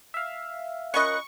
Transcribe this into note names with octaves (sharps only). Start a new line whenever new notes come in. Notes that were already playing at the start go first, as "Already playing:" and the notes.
E5 F5
C#4 F4 A#4 D#5 B5 C#6 F#6